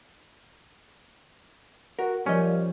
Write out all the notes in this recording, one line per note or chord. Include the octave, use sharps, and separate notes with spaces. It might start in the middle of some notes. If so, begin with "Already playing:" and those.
F#4 A#4
A#2 F3 G3 C#4 D#5 G#5